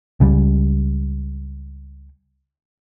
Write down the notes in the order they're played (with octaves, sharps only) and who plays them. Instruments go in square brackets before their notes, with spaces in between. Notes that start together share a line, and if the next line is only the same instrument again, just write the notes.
[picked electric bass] C#2 C#3 G3